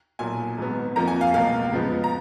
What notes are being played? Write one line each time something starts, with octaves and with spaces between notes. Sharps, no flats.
B1 A#2 F#3 G#5
G#1 G#2 F#3 B3
F2 F3 A#3 A#5
G#5
F5
C#2 B2 F#3 A#3 F5
F#2 C#3 F3 G#3 B3
A#5